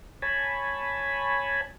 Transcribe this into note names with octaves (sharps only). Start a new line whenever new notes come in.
C#5 G#5 A5 B5